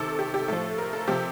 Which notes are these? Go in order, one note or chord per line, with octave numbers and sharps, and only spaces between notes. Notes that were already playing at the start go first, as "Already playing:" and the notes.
Already playing: C3 D#3 A4
G4
G4
A2 F3 A4
A#4
A4
C3 F3 G4